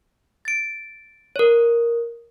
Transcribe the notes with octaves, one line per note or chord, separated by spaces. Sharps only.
A6 D7
A#4 C#5